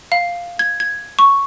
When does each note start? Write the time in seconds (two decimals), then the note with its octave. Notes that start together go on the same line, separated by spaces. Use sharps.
0.12 F5
0.59 G#6
0.80 G#6
1.19 C#6